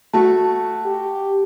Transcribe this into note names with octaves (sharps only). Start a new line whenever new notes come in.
A3 F#4 A5
G4